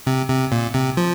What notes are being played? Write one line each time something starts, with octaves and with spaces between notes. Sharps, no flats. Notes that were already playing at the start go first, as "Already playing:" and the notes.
C3
C3
A#2
C3
F3